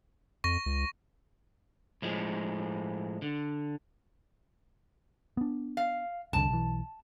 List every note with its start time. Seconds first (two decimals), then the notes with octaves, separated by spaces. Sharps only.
0.44 F2 C#6 A#6
0.66 C#2
2.02 A2 F3 G#3
3.22 D3
5.37 B3 D4
5.77 F5
6.33 F1 C2 D3 A5
6.49 B1 E3